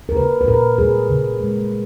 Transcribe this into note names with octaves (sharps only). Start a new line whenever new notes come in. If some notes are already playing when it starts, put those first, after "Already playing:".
A#4
C#3 B4
B4
A#2 A#4
G3 G#4
C#3
G#3